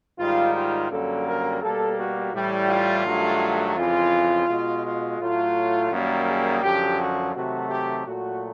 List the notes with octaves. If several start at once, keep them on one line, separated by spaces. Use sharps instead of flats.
G#2 D#3 G3 F4
F4
F#2 D3 G3 A#3 A4
A#4
B2 G3 A#3 A4
F#4
A2 E3 G3
F4
G2 D#3 F#3 A3
F2 C#3 E3 F4
B2 G#3
F4
A2 F#3 A3 F4
F#2 D#3 G3 A#3
G#4
F#2 D3 F3 G4
F#4
C3 D#3 F#3 A3 F#4
G4
A#2 F#3 A3 F#4